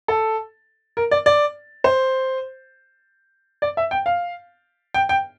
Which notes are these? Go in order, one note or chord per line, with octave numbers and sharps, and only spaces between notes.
A4
A#4
D5
D5
C5
D5
E5
G5
F5
G5
G5